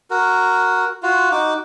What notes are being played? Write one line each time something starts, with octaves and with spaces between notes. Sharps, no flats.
F#4 A#4
F4 F#4
D#4 F#4 D6